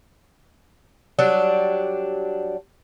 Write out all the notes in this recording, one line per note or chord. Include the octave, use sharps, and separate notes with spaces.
F#3 G3 D4